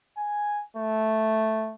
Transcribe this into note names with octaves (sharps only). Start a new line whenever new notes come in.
G#5
A3